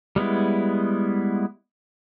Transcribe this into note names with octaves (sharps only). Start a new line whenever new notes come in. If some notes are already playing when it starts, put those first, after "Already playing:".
G3 G#3 B3 E4